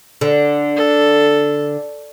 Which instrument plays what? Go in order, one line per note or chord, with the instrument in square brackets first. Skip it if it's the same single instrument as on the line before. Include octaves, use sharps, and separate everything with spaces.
[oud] D3
[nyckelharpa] A4